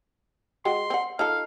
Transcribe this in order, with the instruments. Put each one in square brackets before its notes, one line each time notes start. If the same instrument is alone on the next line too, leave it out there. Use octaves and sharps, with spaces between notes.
[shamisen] G#3 F#4 G5 [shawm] C6
[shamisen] C4 F#5
[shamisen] D#4 F4 A4 [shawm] F5